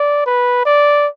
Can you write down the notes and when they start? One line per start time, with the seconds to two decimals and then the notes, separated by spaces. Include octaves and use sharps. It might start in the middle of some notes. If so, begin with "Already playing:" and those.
Already playing: D5
0.26 B4
0.66 D5